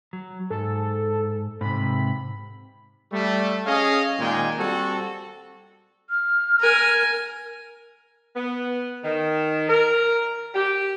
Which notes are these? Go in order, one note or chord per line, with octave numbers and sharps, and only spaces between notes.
F#3
G#2 A4
G#2 C3 B5
G3 A3
C#4 G#4 C#5 D#5 F5
A#2 D#3 G#3 G5 G#5
G3 C4 F#4 A4
F6
A#4 G#5
B3
D#3
A#4
G4